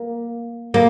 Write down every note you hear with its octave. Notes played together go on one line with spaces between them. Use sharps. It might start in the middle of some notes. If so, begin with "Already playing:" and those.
Already playing: A#3
A#3